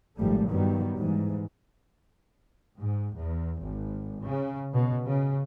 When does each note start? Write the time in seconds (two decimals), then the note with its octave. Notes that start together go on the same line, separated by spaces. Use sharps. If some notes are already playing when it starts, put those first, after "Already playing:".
0.17 G#1 G#2 F3 G3 A3
0.48 G2 D#3 F#3 G3 B3
0.96 G#2 E3
2.80 G#2
3.16 E2
3.61 G#1
4.23 C#3
4.73 B2
5.05 C#3